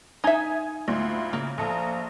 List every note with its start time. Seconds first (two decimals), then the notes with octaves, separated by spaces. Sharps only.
0.24 D#4 E5 G#5 D#6 G#6
0.88 D2 G#2 E4 F4
1.33 C#3 A#3
1.58 A#1 F3 A4 A#5 D#6